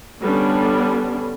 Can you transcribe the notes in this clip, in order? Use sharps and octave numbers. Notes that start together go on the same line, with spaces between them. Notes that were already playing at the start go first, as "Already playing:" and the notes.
D3 G3 B3 C#4 D4